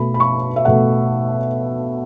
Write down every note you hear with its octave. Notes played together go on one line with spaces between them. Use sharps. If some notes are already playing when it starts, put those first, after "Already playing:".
Already playing: B2 A3 B5
B5
C#6
E5
B2 A3 F#5